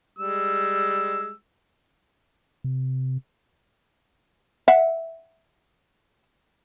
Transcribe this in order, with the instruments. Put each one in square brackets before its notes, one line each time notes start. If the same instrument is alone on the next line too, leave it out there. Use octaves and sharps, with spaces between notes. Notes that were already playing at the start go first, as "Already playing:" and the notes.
[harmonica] G3 G#3 E6
[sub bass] C3
[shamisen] E5 F#5